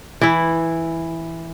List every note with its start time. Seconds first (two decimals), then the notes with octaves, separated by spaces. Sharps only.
0.21 E3 E4